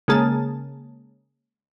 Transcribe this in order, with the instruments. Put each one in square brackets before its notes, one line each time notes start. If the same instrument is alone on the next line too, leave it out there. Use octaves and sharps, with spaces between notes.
[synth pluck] C#3 G#3 A#3 G#4 A5